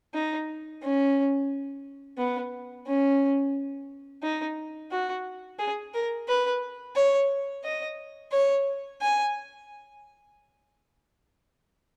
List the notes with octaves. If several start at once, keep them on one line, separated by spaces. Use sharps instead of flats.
D#4
C#4
B3
C#4
D#4
F#4
G#4
A#4
B4
C#5
D#5
C#5
G#5